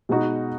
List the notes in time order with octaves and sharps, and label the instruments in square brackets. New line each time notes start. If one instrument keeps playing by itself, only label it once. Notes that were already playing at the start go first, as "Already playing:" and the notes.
[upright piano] B2 G#3 B3 D#4 F#4